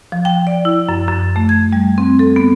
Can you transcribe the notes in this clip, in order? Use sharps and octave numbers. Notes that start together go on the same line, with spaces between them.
F3
G5
D5
E4
F#2
F#2
A3
G#6
G3
C4
A4
B3